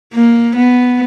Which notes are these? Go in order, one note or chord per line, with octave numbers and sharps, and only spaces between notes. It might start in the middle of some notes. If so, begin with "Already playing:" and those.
A#3
B3